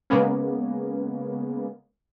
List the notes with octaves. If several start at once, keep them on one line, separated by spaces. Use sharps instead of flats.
C#3 G#3 A#3 B3 C#4